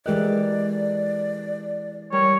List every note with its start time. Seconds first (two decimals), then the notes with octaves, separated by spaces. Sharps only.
0.06 E3 G#3 G4 A#4 D5 D#5 F#6
2.12 G3 A#4 C#5